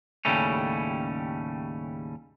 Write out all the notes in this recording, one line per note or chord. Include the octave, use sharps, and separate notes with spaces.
D#2 A2 C#3 G3 A3 C#4